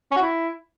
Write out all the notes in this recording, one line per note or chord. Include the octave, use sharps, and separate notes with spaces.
C#4
F#4
E4